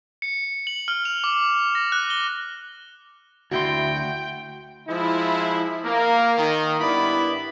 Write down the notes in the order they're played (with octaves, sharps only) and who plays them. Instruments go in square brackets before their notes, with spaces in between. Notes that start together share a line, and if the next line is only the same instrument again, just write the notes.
[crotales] C#7
F#7
F6
F7
D6
A#6
F#6
G7
[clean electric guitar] D2 E4 C6 [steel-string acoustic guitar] F#4 [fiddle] G5
[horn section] F3 G#3 E4
A#3
D#3
G2 B3 E4 D5 B5